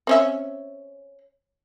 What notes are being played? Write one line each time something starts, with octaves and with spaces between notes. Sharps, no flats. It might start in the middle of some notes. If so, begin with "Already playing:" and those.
C4 C#4 E5